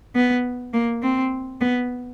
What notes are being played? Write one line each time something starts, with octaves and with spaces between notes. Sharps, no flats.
B3
A#3
C4
B3